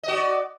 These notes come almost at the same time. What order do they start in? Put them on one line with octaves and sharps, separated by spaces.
D#5 F#4 D5